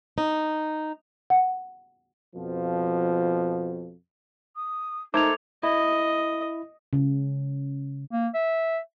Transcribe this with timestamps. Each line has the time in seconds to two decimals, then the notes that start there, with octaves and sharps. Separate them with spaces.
0.18 D#4
1.30 F#5
2.36 F2 B2 F3
4.56 D#6
5.14 A3 D#4 A4 A#4 C5 D6 G#6 F7
5.63 E4 D#5
6.93 C#3
8.12 A#3
8.34 E5